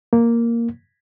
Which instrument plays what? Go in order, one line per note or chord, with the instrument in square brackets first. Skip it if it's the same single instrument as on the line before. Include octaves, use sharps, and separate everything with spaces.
[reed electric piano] A#3